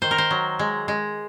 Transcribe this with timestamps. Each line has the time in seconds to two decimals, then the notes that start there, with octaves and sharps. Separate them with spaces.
0.02 D#3 C5
0.11 A#4
0.18 C5
0.31 F#3
0.59 G#3
0.88 G#3